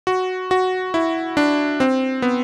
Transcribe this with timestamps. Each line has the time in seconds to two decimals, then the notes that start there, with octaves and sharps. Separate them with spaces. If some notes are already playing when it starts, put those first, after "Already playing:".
0.07 F#4
0.51 F#4
0.94 E4
1.37 D4
1.80 C4
2.22 B3